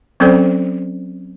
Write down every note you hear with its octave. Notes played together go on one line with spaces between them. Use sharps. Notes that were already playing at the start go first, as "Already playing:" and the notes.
F#3 C4 C#4 A4 C5 D5